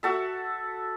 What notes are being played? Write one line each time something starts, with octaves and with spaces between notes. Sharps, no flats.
F#4 A4 E5